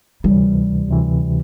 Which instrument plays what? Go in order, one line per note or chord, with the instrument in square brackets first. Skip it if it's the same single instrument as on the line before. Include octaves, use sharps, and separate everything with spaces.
[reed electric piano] D2 C3 E3 [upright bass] G3
[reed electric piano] D2 C3 E3